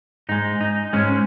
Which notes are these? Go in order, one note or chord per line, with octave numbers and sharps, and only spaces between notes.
G#2 G#3 D#4
D#4
G#2 G#3 C#4